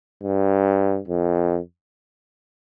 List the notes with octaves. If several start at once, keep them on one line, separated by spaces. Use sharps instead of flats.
G2
F2